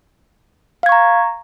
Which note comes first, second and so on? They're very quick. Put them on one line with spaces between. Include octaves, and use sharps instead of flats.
F5 G#6 C#6 A#5